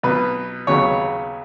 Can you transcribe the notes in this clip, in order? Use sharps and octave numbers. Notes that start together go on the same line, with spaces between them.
B1 B2 B3 B4
D#2 C#3 F#3 B3 C#5